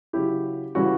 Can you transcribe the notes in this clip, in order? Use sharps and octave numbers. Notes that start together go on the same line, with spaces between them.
C#3 F#3 C#4 E4 G4
C#3 E3 G3 C#4 E4 F#4